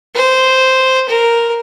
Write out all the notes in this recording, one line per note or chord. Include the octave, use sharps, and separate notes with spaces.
C5
A#4